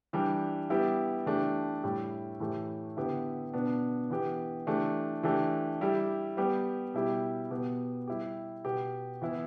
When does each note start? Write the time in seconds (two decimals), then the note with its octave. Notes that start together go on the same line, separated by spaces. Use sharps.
0.13 E3 G3 D4 G4
0.70 G3 B3 E4 G4
1.26 E3 A3 D4 G4
1.84 A2 G3 E4 G4
2.40 A2 E3 A3 G4
2.97 D3 B3 E4 G4
3.54 B2 B3 D4
4.10 E3 B3 G4
4.67 E3 A3 D4 G4
5.23 E3 A3 D4 G4
5.81 G3 E4 G4
6.37 G3 B3 G4
6.94 B2 G3 E4 G4
7.51 B2 B3 G4
8.08 G3 E4 G4
8.65 B2 B3 G4
9.22 E3 B3 E4